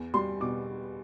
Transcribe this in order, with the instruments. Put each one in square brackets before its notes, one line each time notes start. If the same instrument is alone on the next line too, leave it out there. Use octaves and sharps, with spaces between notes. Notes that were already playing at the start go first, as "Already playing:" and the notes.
Already playing: [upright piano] E2
G3 C6
B2 D6